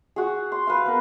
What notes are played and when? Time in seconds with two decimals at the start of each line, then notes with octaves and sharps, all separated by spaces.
0.16 F#4 G#4
0.52 C6
0.67 B4 F5
0.86 B3 A#4